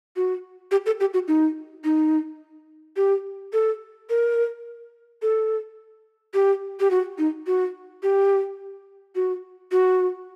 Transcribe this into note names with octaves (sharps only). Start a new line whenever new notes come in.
F#4
G4
A4
G4
F#4
D#4
D#4
G4
A4
A#4
A4
G4
G4
F#4
D#4
F#4
G4
F#4
F#4